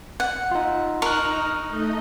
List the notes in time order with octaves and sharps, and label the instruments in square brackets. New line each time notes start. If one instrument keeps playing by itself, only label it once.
[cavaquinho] F#5
[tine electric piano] D#4 F4
[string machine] D#4 [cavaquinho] A#4 [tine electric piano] C#6 F6 F#6
[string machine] A3 D#4 D#5